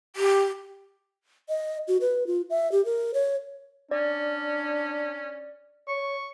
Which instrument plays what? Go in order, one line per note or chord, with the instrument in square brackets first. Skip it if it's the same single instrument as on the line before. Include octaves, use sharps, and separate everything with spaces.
[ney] G4
[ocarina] D#5
F#4
B4
F4
E5
G4
A#4
C#5
[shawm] C#4 [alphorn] D4 [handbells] D5
[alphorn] C#5 [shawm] C#6